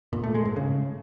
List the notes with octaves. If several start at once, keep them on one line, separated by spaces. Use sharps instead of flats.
A#2
A3
G#3
G#2
C#3